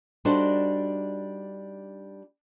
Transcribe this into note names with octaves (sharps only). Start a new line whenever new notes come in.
G3 D4 D#4 F#4 A4 C5